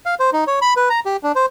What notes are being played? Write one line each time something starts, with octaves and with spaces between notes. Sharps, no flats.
F5
C5
D#4
C#5
B5
B4
A#5
G4
D4
C5